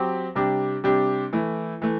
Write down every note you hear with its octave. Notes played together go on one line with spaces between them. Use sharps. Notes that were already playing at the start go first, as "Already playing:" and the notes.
Already playing: F#3 C4 G4
C3 G3 D4 G4
C3 G3 D4 G4
E3 A3 E4
E3 A3